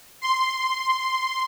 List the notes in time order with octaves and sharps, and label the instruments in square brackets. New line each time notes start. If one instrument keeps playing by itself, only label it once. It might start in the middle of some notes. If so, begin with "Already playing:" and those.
[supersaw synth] C6